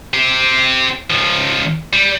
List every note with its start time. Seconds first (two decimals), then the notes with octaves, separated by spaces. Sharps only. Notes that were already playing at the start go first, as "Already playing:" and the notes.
0.14 C4 G4
1.10 C#2 F3
1.93 G3